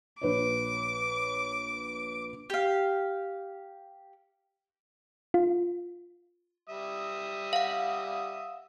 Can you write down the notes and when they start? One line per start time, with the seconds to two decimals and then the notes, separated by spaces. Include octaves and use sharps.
0.22 A#1 B4 C#5 D6
2.50 G4 F5
5.34 F4
6.69 G3 E5 D#6
7.53 F5 F#5